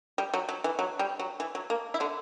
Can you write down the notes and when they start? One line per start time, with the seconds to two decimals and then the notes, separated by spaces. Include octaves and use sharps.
0.18 G3
0.34 F#3
0.49 F#3
0.64 E3
0.79 F#3
0.99 G3
1.19 F#3
1.40 E3
1.55 F#3
1.70 A#3
1.94 E4
2.00 D3 D4